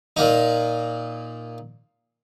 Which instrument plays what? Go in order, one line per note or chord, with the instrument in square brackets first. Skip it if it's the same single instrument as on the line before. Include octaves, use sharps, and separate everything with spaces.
[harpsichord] A#2 A#3 D#4